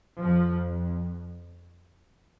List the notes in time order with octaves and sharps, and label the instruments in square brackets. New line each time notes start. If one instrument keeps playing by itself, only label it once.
[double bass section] F2 F3